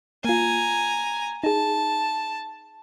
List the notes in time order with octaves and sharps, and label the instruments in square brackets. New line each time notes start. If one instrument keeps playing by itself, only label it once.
[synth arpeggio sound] A#3 F4 [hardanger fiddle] G#5 A#5
[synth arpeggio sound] D#4 G#4 [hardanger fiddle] A5